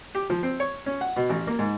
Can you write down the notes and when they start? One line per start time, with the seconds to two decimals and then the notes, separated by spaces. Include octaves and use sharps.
0.15 G4
0.30 F3
0.43 C4
0.60 C#5
0.86 C#4
1.01 F#5
1.16 B2
1.30 A1
1.47 A#3
1.59 G#2